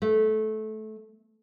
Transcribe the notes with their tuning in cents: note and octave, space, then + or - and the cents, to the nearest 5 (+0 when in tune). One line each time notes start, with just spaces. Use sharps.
A3 -20